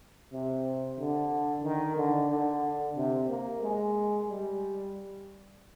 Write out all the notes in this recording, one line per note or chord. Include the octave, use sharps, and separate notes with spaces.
C3
D3
D#3
D3
D3
C3
A#3
G#3
G3